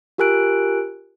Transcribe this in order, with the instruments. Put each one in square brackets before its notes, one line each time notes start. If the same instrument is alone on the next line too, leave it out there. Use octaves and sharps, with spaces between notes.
[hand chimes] F4 G4 A#4 G#5 F#6 D7